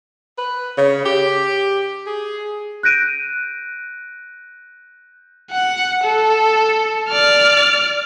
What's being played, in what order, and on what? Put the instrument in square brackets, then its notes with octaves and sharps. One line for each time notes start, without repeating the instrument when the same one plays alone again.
[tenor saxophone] B4
C#3
G4
G#4
[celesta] F#6 G6 A#6 D7 D#7
[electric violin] F#5
A4
D5 F6